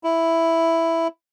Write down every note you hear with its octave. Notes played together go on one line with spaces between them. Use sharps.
E4